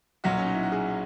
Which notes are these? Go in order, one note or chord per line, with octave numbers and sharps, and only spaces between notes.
B1 A#2 F#3 F#4
C#4
D#4
E4
F#4
G#4